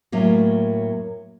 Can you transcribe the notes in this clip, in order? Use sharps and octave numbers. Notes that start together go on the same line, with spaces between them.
A2 F#3 A#3 C#4